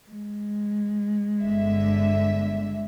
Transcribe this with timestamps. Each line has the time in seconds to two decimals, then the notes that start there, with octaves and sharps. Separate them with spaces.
0.10 G#3
1.41 G1 D3 E5